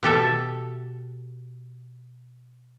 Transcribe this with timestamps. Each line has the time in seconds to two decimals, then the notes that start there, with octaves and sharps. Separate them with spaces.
0.03 B2 G4 A4 E5